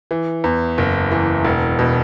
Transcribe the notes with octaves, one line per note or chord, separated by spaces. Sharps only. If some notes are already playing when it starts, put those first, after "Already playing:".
E3
E2
F#1
E3
E1
B2